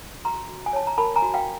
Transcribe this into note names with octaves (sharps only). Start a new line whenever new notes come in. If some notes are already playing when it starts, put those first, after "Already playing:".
F#4 A#5 C6
F#4
G#5
C#5 A5
A#5
A#4 A5 B5
G#5 A#5
F#4
F5 G5